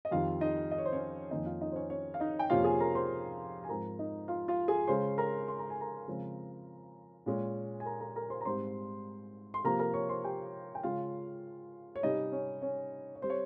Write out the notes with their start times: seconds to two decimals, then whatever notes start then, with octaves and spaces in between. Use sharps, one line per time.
0.05 D#5
0.11 F2 D#3 G3 F4 F5
0.41 D#4 D#5
0.71 D#5
0.78 C#5
0.85 C5
0.93 C#4 C#5
1.31 F2 D#3 A#3 C#4 D#4 D#5
1.46 F4 F5
1.61 D#4 D#5
1.72 C5
1.75 C#4 C#5
1.90 C#4 C#5
2.14 F5
2.20 D#4 D#5
2.39 G5
2.50 F2 C3 F3 A#3 C#4 F4 F5
2.64 G#4 G#5
2.80 A#4 A#5
2.95 C5 C6
3.64 G#5
3.69 G#2 F3 G#3 C4 A#4 A#5
3.99 D#4 D#5
4.28 F4 F5
4.48 F4 F5
4.68 G#4 G#5
4.88 C#3 G#3 C#4 C5 C6
5.18 A#4 A#5
5.48 C6
5.59 A#5
5.70 G#5
5.81 A#4 A#5
6.08 C#3 F3 G#3 C4
7.26 A#2 G#3 C#4
7.80 G#5
7.85 A#4 A#5
8.00 A#4 A#5
8.16 A#4 A#5
8.30 C5 C6
8.41 A#5
8.45 G#2 G3 C4 C5 C6
9.54 C6
9.64 C3 F3 A#3 A#4 A#5
9.79 A#4 A#5
9.94 C#5 C#6
10.09 C5 C6
10.24 G4 G5
10.75 G5
10.83 C#3 G#3 C#4 F4 F5
11.96 C#5
12.02 C3 G3 C#4 D#4 D#5
12.32 C#4 C#5
12.62 C#4 C#5
13.15 C#5
13.21 G3 C4 C5
13.30 C#5